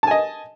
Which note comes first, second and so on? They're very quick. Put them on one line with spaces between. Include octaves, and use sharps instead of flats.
A5 G#5 D#5